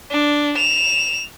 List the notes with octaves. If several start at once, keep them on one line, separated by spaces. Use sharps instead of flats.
D4
E7 F7